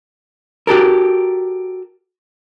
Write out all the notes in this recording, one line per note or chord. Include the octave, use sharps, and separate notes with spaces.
F#4 G4 A4 A#4